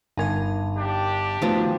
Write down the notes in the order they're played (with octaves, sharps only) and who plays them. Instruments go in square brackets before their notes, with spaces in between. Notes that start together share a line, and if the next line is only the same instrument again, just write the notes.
[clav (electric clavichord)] G1 G#5 [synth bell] D#4 A#4 A5
[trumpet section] D4 G4
[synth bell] D#3 A3 D#4 [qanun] F3 F#3 B3